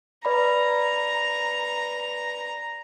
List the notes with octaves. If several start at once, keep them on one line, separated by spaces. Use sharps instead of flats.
B4 D5 A#5 B5